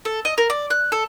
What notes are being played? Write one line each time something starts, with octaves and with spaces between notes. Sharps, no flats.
A4
D#5
A#4
D5
F#6
A4